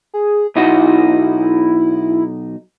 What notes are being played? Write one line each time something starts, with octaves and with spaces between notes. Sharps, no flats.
G#4
B1 D#4 E4 F#4